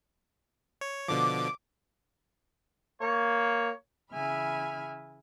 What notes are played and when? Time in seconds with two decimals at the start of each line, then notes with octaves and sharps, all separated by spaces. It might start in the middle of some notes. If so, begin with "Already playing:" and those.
0.81 C#5
1.08 B2 D3 F3 D6
3.01 A#3 C#5
4.12 C#3 E3 E5 G#5 B5 F6